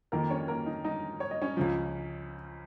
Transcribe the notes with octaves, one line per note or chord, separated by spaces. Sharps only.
F2 D#3 A#3 A#4
C#4 C#5
A#3 A#4
D#4
D#4 D#5
C#5
D#5
C#4 C#5
C#2 C#3 F3